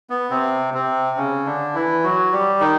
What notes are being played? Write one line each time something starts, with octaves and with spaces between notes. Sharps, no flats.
B3
C3 C4
C3 C4
C#3 C#4
D3 D4
E3 E4
F#3 F#4
G3 G4
D#3 D#4